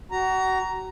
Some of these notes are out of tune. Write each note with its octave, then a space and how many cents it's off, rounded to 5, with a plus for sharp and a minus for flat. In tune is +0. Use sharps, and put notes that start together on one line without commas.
F#4 +30 A#5 +0